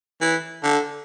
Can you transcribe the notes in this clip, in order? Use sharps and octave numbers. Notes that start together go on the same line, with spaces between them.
E3
D3